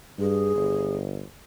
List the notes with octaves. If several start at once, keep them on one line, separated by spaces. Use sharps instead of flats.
G2 G#4
G1